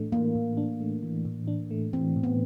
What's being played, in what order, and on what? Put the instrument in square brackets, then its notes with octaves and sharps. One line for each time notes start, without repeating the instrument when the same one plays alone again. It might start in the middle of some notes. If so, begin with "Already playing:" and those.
Already playing: [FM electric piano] A2 E3 A3 D4
[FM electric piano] E3 [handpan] A#3
[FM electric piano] A2
D4
A3
E3
A2
D4
A3
[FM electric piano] E3 [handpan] C4
[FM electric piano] A2
[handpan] B3